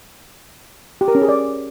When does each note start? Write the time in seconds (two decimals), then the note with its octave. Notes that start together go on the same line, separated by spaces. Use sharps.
1.01 G4
1.08 A#4
1.15 C#4
1.22 G#4
1.29 D5